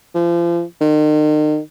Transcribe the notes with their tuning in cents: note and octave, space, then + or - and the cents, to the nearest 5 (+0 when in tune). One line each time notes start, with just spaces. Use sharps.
F3 -35
D#3 -40